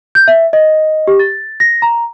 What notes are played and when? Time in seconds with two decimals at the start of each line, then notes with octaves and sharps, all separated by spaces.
0.15 G6
0.28 E5
0.53 D#5
1.07 G4
1.20 A6
1.60 A#6
1.82 A#5